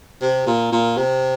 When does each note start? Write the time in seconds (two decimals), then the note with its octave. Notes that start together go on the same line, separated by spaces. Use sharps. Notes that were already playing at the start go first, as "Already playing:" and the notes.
0.22 C3
0.46 A#2
0.72 A#2
0.97 C3